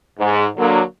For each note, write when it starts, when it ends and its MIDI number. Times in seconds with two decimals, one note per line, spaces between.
0.20 0.45 44
0.57 0.82 50
0.57 0.82 54
0.57 0.82 58